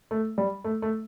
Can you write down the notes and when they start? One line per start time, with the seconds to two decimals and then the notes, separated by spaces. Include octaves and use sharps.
0.11 A3
0.38 G3
0.64 A3
0.82 A3